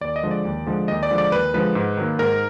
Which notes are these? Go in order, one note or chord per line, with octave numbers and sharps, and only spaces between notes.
D#2 D5
D#5
D3 F3 G#3
D5
D#2
D3 F3 G#3
D#2 D#5
D5
D3 F3 G#3
D5
D#2 B4
D3 F3 G#3 B4
G#2
D#3 F#3 A#3
G#2 A#4